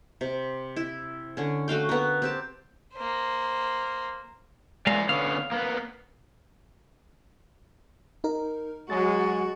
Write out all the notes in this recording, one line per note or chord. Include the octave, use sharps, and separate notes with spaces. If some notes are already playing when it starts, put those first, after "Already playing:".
C3
E4
D3 C#4
A3 F#4 F5 G5
B3 A#4
C4 G4 A5
A#3 C5
G#3 A#4 D5 E5 F5 G#5
D3 B3 C#4 F5
A#3 B3
D#4 A#4
F#3 G#3 F#4 A6